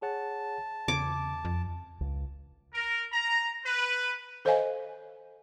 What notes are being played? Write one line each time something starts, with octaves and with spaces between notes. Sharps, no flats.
G#4 C#5 F#5 A5
E2 C#3 D6 G#6
F2
C#2
A#4
A#5
B4
A4 C5 C#5 D#5 F5 G#5